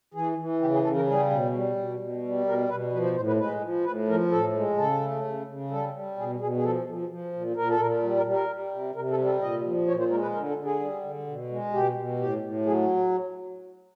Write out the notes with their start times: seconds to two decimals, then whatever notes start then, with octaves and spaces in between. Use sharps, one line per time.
0.14 E3 G#4
0.38 E3
0.61 C#3 G4
0.73 G#4
0.84 C#3 A4
0.96 A#4
1.07 G3 G#4
1.31 B2
1.53 G3
1.76 B2
2.00 B2
2.23 G3
2.46 B2 A#4
2.69 B2 B4
2.92 F3 B4
3.04 C5
3.16 A2 C5
3.27 B4
3.39 G#3 B4
3.62 F3
3.85 A2 B4
4.08 F3 A#4
4.31 A2 A4
4.55 G#3
4.77 C#3 A4
5.01 A3
5.25 C#3
5.47 C#3
5.71 G3 A4
5.94 G3
6.17 B2 G#4
6.40 B2 G#4
6.57 G#4
6.63 F3 A4
6.87 F3
7.09 F3
7.33 A#2
7.56 A#2 A#4
7.69 A4
7.79 A#2 A#4
8.03 G3
8.17 A#4
8.26 G3
8.33 A#4
8.48 G3
8.71 C3
8.95 C3 A#4
9.10 A4
9.18 G3
9.25 A4
9.41 A#2 D#5
9.64 F3
9.88 A#2 C#5
9.99 C5
10.10 G#3 A#4
10.22 B4
10.33 D3 A#4
10.49 A4
10.57 D3
10.65 G#4
10.80 G3
11.03 D3
11.27 B2
11.50 G#3
11.73 B2 G4
11.96 B2
12.20 A2 G4
12.42 A2
12.66 F#3 G#4